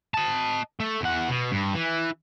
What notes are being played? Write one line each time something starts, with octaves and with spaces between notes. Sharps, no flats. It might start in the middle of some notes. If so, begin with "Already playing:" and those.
D#5 A5
A3
E2 F#5
B2
G2
E3